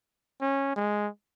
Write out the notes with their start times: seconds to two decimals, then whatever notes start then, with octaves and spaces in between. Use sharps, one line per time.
0.41 C#4
0.76 G#3